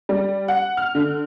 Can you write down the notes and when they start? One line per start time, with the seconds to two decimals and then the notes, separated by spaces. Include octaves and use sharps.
0.09 G3
0.48 F#5
0.77 F6
0.95 D3